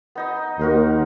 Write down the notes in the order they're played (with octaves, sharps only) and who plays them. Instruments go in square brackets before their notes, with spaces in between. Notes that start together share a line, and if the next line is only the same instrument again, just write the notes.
[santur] B3 D#4 D#5
[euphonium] D#2 [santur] F#4 A#4 C6